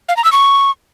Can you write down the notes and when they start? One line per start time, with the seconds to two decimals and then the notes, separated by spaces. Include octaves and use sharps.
0.09 F5
0.17 A#5
0.24 E6
0.32 C#6